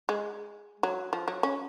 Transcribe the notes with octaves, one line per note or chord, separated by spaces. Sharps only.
G#3
F#3
F3
F#3
C#4